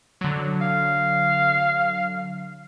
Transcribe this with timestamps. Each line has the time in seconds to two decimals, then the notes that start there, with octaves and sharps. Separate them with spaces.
0.21 D3 F#3
0.61 F5